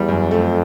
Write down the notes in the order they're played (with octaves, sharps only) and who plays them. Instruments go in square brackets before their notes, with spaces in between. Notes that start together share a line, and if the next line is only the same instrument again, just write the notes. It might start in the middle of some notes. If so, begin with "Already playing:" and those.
Already playing: [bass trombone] E2 [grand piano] G3
[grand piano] F#2
[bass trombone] F2 [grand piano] A3